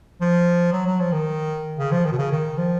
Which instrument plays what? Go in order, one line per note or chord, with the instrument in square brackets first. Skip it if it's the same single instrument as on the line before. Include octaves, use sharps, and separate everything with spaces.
[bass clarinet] F3
F#3
F#3
F3
D#3
C#3
F3
D#3
B2
C#3
D#3
F3